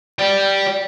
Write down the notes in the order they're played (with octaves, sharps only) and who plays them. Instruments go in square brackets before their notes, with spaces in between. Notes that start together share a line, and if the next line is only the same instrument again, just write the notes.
[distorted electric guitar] D5 G5